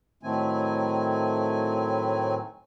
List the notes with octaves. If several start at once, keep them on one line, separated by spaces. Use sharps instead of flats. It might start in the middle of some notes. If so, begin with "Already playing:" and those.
A2 D#3 F#3 A3 C4 G#5